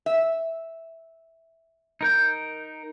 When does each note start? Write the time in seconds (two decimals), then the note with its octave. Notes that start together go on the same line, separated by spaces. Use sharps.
0.06 E5
2.01 D#4 A#4 G6